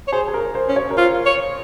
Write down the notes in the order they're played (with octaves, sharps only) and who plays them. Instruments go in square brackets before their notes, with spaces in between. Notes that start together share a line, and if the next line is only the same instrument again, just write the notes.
[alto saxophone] C#5
[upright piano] G#4 [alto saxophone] C5
[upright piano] G#4
A#4
C5
[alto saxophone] C#4
[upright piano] C#5
A#4
[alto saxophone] F4 [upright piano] C5
[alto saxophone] C#5